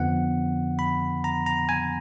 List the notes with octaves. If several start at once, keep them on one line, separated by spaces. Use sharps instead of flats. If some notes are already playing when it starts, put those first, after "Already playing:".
Already playing: F2 D3 F3 B3 F#5
B5
A#5
A#5
G#5